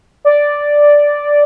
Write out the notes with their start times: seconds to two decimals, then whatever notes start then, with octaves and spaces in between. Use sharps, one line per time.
0.25 D5